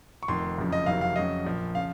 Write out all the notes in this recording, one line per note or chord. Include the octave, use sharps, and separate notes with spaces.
C#6
F1 F2 D#3 C6
F#1 F2 C#3 F3
D#5
F#1 F2 C3 D#3 F#3 F5
F5
F2 C#3 F#3 D#5
A#1 A#2 F3
C#3 F3 F5